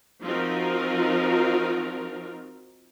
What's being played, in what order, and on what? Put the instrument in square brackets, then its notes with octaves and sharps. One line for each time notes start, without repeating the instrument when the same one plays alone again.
[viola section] F3 C4 D#4 F4 F#4 A#4